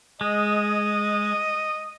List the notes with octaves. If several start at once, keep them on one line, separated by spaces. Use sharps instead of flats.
G#3 D#5